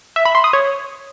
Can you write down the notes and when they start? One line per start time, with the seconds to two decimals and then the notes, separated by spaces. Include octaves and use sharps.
0.16 E5
0.25 B5
0.35 C6
0.44 D#6
0.53 C#5